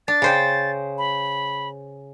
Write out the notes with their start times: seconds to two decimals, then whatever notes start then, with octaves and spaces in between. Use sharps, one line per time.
0.08 D4 A6
0.22 C#3 C5 G5
0.98 B5